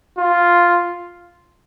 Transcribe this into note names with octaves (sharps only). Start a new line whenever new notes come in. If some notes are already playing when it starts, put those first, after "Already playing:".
F4